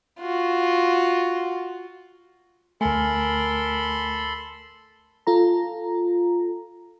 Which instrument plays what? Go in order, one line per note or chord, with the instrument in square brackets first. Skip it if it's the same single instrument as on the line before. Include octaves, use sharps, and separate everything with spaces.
[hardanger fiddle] F4 F#4
[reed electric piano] D2 A3 [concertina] A4 B5 C6 [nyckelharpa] A#4 [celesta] G#5
[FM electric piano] F4 A4 A#5